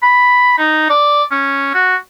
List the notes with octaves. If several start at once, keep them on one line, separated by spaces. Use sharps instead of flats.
B5
D#4
D5
C#4
F#4